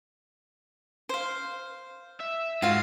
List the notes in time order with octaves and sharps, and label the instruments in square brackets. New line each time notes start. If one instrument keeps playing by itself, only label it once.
[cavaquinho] C5 F5
[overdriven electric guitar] E5
[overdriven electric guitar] G#2 [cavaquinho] F4 F#4 F5